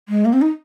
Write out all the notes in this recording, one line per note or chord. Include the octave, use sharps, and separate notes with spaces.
G#3
A#3
C4
D#4